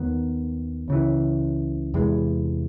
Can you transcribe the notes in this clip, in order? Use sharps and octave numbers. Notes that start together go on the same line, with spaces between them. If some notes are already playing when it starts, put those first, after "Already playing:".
Already playing: D#2 D#3 B3
C#2 C#3 E3
E2 C3 E3 G#3